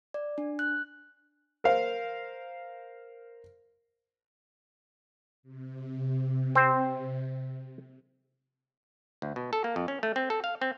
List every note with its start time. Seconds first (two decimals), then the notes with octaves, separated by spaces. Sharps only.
0.14 D5
0.38 D4
0.59 F#6
1.64 A#4 C5 F5
5.43 C3
6.55 C4 C5
9.22 D2
9.36 B2
9.53 A4
9.64 A#3
9.76 F2
9.88 C#4
10.03 A3
10.16 C4
10.30 A4
10.44 F5
10.61 C4